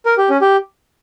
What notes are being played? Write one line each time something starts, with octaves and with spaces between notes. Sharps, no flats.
A#4
G4
C#4
G4